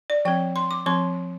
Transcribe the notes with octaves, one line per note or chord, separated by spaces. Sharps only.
D5
F3 C4 G5
C6
D6
F3 C4 C6